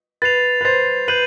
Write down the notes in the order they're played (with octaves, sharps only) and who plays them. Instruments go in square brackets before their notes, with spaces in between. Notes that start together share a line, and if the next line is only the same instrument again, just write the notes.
[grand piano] B4 [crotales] A6 C7 F7
[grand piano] B4
[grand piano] C5 [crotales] A6 C7 F7
[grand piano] B4 [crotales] G6 C7 D#7 F#7